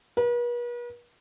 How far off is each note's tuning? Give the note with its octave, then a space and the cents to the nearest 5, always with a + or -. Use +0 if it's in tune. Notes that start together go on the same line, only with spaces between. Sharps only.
B4 -45